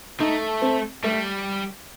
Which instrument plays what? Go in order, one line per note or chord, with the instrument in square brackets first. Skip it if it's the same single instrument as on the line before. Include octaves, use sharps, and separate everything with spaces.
[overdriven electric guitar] A3 [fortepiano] D#4
[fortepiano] C4
[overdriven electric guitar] G3 [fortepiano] A3